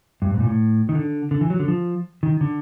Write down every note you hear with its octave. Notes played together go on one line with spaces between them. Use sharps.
G2
G#2
A#2
A2
D#3
D3
D3
E3
F#3
D3
F3
D#3
D3